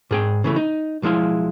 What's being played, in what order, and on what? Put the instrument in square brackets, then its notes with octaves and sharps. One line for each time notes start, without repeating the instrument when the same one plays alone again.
[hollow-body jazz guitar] G#2 G#4 G5
C#3 E3 A3
D#4
B1 F3 G#3 E4 F5